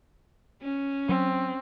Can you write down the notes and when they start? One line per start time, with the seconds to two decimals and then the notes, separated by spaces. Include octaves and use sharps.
0.62 C#4
1.09 F#3 C4